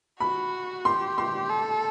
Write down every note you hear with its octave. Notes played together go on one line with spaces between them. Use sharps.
F#4 B5
G4 C6
C6
A4